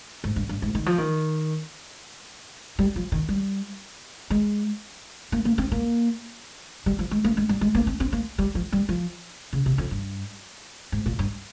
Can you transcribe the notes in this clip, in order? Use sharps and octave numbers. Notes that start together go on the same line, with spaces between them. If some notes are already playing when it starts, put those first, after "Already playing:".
G#2
G2
G2
G#2
D#3
F3
D#3
G3
F3
D#3
G3
G#3
A#3
A#3
C4
A#3
G3
F3
G#3
A#3
G#3
G3
G#3
A#3
C4
C4
A#3
G3
F3
G3
F3
C#3
C3
F2
G2
G#2
A#2
G2